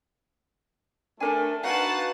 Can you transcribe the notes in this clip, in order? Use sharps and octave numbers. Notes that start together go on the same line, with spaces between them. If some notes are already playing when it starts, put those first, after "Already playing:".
A3 D4 A4 A#4 G#5
D#4 F#4 B4 F5 F#5 A5